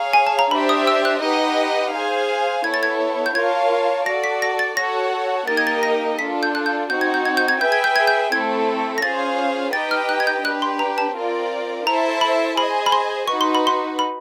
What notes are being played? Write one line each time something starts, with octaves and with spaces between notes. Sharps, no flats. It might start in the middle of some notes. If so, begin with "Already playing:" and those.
Already playing: G#4 C#5 F5 A#5
G#5
A5
A#5
D4 G4 C5 E5 B5
D#6
E6
F#6
D#4 G4 B4 D#5 F#5
G#4 C5 F5 G#5
B3 E4 A4 C#5 G#6
A6
G#6
G6
F4 A#4 C#5 F5 A5 G#6
F#4 A4 D5 A#6
B6
A#6
A6
F#4 A4 C#5 F#5 A#6
A#3 D#4 G4 A#4 D#5 A6
G#6
A6
A#6
D4 F4 A4 B6
G6
F#6
G6
C4 D#4 F#4 G6
G#6
G6
G#6
G6
G#6
G#4 B4 E5 G5 G6
G#6
G6
G#6
G6
A3 C4 E4 A4 G#6
A#6
C#4 F4 G#4 C5 F5 A6
D#4 G4 B4 D#5 G5 A6
F6
F#6
G#6
G6
D4 G4 B4 F#6
C6
A#5
A5
C4 F4 A#4 D5
E4 A4 C5 E5 A5 A#5
B5
G#4 C5 D#5 G#5 B5
B5
C6
D#4 F#4 B4 C#6
C6
B5
C6
B5